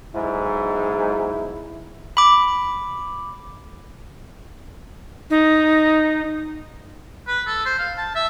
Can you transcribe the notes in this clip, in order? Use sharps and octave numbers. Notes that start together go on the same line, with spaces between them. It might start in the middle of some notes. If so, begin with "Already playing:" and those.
B1 G#2 E4
B5 D6
D#4
B4
A4
C5
F5
A5
E5